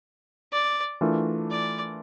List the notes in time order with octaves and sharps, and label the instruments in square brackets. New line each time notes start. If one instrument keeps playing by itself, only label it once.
[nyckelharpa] D5
[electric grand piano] E3 A3 D4 F4 A#4
[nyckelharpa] D5